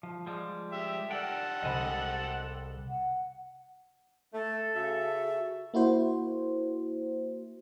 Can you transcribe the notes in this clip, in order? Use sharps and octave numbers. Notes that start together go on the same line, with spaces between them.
F3
F3 G3 G#3
G4 E5
G4 A4 A#4 D5 F#5 G5
C2 C3 G#3 D#5 G#5 B5
F#5
A3 A4
C#3 F#4 E5
A#3 E4 F#4 C5